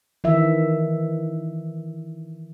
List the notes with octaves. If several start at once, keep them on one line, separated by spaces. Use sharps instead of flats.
D#3 E3 E5